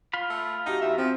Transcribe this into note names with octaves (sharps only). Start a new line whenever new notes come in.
F4 F5 B5
A3
D#4 F#4 G4
E2 E5
F3 C4